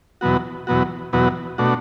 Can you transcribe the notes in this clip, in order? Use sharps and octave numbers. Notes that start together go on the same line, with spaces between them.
E2 B2 F#3 B3 F#4
E2 B2 F#3 B3 F#4
E2 B2 F#3 B3 F#4
B2 A3 D4 F#4